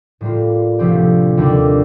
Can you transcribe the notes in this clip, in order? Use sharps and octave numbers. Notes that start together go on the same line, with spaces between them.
A2 G3 A#3 F4
D2 C3 F3 C4 G4
D#2 D3 G3 D4